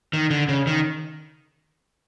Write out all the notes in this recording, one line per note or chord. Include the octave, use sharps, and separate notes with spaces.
D#3
D3
C#3
D#3